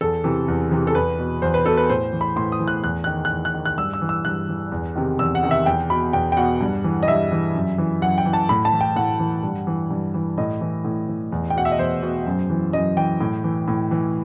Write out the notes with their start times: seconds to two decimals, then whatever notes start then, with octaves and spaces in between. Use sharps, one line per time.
0.01 E2 A4
0.24 C3 E3
0.48 E2
0.71 C3 E3
0.87 A4
0.95 E2 B4
1.19 B2
1.42 E2 C5
1.54 B4
1.65 B2 A4
1.77 B4
1.89 A2 C5
2.13 E3
2.21 B5
2.36 A2 C6
2.52 D#6
2.60 E3
2.68 F#6
2.84 E2 F#6
3.04 D#3 F#6
3.25 F#6
3.31 E2
3.45 F#6
3.54 D#3
3.65 F#6
3.77 G2 E6
3.93 E6
4.02 E3
4.09 E6
4.25 G2 F#6
4.49 E3
4.72 E2
4.96 C3 D#3
5.19 E2 E6
5.35 F#5
5.43 C3 D#3
5.51 E5
5.66 E2 G5
5.90 B2 B5
6.13 E2 G5
6.32 G5
6.37 B2 F#5
6.61 G2
6.84 E3
7.03 D#5
7.08 G2 E5
7.32 E3
7.55 F#2
7.78 E3
8.02 F#2 F#5
8.18 G5
8.26 E3
8.33 A5
8.49 A2 B5
8.65 A5
8.73 E3
8.81 G5
8.96 A2 F#5
9.20 E3
9.43 G2
9.67 E3
9.91 G2
10.14 E3
10.38 A2 D#5
10.61 E3
10.85 A2
11.08 E3
11.32 E2
11.50 G5
11.56 B2 F#5
11.65 E5
11.72 D#5
11.79 E2 C5
12.03 B2
12.26 F#2
12.50 E3
12.73 F#2 D#5
12.97 E3 G5
13.21 A2
13.44 E3
13.68 A2
13.91 E3